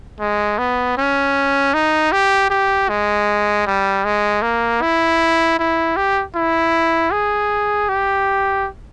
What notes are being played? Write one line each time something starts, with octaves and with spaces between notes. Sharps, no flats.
G#3
B3
C#4
D#4
G4
G4
G#3
G3
G#3
A#3
E4
E4
G4
E4
G#4
G4